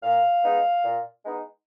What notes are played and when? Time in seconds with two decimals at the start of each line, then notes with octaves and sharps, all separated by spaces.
0.03 A#2 F5
0.44 G#3 B3 D#4
0.83 A#2
1.24 G#3 B3 D#4